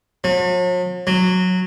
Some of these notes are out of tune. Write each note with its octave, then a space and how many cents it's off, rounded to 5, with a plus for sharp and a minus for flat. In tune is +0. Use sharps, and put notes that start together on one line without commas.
F#3 -45
F#3 -10